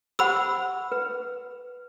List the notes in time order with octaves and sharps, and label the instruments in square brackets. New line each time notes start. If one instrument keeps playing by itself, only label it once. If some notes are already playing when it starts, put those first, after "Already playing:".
[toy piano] G4 C5 F#5 [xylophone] B5 E6
[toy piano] B4